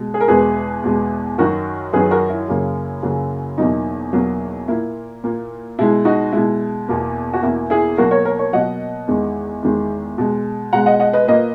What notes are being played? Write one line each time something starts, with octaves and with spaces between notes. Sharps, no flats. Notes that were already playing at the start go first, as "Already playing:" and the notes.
Already playing: B2 G#3
G#4
A#4
E2 B2 G#3 G#4 B4
E2 B2 G#3
F#2 D#3 F#3 F#4 A#4
F#2 D#3 F#3 G#4 B4
F#4 A#4
E4
F#2 C#3 F#3 A#3
F#2 C#3 F#3 A#3
E2 B2 F#3 A#3 D#4
E2 B2 F#3 A#3
A#2 A#3 E4
A#2 A#3
B2 G#3 E4
D#4 F#4
B2 G#3 E4
E2 B2 A#3
F#4
E2 B2 A#3 E4
E4 G#4
B2 F#3 A#3 F#4 A#4
A#4 C#5
A#4 C#5
A#4 C#5
B2 F#3 A#3 D#5 F#5
E2 D#3 G#3
E2 D#3 G#3
B2 G#3
B2 G#3 F#5 A#5
D#5 F#5
D#5 F#5
B4 D#5
A#2 A#3 B4 D#5